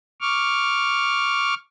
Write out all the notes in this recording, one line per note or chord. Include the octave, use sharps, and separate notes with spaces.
C#6 D6 F6